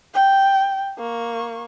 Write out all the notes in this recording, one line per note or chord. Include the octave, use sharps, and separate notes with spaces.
G5
A#3 C#6